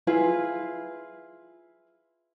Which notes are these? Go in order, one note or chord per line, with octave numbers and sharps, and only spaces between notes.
E4 F4 G#4 B4